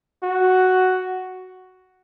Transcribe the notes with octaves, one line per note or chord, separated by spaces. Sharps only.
F#4